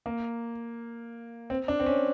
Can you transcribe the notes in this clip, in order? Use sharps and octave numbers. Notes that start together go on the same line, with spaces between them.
A#3
C4
D4
C4
C#4